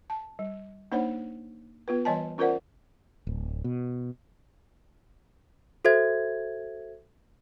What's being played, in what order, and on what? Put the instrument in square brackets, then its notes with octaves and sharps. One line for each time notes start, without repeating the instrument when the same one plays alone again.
[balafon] A5
G3
A#3 D4 D#4 C5 C#5 F#5
B3 F4 B4
E3 G3 C#5 D#5 G#5 A5
C#4 F4 A#4 C5 D5 F#5
[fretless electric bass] D1
B2
[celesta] F#4 A4 C5 E5 G#6